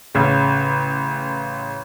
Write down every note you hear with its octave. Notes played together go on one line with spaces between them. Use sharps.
A1 C#3